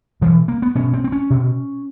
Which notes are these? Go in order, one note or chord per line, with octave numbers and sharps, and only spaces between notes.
B2 E3
A#3
B3
B2 C#4
C4
C4
C#4
B2